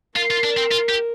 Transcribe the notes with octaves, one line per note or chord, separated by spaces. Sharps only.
F4 A#4
F4
D4
C4
F4
G4